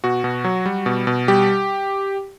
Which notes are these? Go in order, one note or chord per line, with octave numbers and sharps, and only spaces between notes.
B2 F#4
B2
F#3
G3
B2
B2
G3 G4